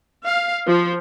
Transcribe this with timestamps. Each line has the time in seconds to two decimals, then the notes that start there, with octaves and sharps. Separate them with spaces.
0.25 F5
0.67 F3